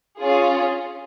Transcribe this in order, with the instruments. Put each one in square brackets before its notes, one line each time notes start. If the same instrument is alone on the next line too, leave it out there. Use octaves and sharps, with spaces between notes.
[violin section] C#4 F4 G#4